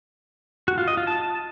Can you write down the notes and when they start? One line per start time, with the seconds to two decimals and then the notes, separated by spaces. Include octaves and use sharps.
0.68 F#4
0.78 F4
0.88 D#5
0.97 F4
1.07 A5